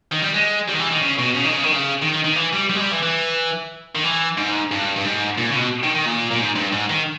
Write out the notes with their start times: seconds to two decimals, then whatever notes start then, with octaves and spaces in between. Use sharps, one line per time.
0.12 D#3
0.22 G3
0.34 G#3
0.68 G3
0.74 D#3
0.79 E3
0.90 D#3
1.01 C#3
1.18 B2
1.34 C#3
1.44 D#3
1.54 C#3
1.64 D#3
1.72 C#3
2.02 D#3
2.13 D#3
2.24 D#3
2.36 E3
2.53 G3
2.70 G3
2.75 G#3
2.80 G3
2.92 E3
3.03 E3
3.95 D#3
4.04 E3
4.38 G#2
4.72 G2
4.96 G2
5.05 G#2
5.38 A#2
5.50 C#3
5.55 B2
5.83 D#3
5.95 D#3
6.06 A#2
6.31 A#2
6.39 G#2
6.56 G2
6.72 G#2
6.90 D#3